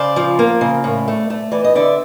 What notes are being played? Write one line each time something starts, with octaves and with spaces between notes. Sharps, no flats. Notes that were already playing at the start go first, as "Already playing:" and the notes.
Already playing: C#3 C5 D5
F3
A#3
C#3
A2
A3
A3
E3 D5
D#5
D3 D5 E5